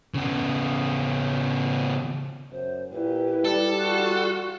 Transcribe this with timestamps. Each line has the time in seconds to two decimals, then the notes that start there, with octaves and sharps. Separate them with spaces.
0.15 C#3 B3
2.51 F#2 C5
2.92 A#2 E4 G4 B4
3.45 G3 A4
3.79 F4 F#4 F#6